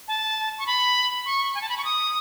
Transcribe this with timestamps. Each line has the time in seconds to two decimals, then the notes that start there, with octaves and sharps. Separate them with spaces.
0.08 A5
0.59 C#6
0.67 B5
1.26 C#6
1.55 G#5
1.61 A5
1.69 B5
1.78 C#6
1.85 D#6